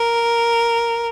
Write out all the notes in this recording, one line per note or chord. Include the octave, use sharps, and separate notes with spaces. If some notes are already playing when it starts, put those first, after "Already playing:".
Already playing: A#4